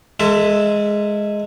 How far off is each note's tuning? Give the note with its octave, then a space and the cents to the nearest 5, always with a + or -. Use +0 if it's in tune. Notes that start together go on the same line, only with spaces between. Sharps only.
G#3 +0 A4 +40 E5 +0